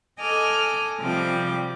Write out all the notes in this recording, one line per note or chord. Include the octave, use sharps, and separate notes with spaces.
A4 D#5 G#5 D6 F6
C3 F3 G3 D6